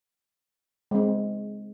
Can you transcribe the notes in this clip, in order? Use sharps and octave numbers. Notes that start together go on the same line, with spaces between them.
G#3 C4